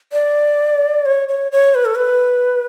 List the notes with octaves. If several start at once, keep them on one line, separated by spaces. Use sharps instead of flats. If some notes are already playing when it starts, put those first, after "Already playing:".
D5
C#5
C#5
C#5
B4
A4
B4